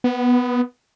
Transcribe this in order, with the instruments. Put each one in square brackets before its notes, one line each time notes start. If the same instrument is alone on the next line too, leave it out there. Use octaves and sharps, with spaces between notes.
[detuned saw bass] B3